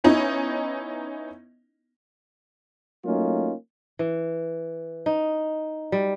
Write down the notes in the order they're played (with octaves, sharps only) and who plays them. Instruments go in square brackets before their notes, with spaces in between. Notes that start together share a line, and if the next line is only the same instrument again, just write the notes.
[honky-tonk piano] B3 C#4 D#4 E4
[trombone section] F#3 A3 A#3 C#4 D#4 F4
[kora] E3
D#4
G3